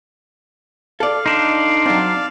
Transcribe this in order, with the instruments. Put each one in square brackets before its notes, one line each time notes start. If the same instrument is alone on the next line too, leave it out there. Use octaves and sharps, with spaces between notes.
[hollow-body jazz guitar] A4 D5 [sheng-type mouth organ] F5
[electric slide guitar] D4 D#4 [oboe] C6
[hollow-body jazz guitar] F#3 C4 [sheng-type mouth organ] D5 F5